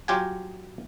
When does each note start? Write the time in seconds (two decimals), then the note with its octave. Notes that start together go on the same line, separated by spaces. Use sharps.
0.08 F#3 F4 G4 G5 G#5